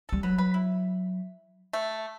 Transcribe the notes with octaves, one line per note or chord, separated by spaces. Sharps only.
G3 A4
F#3 B4
B4
E4
A3